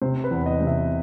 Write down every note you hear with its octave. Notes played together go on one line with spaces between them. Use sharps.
C3 C5
B4
E2
D#5
C3
E5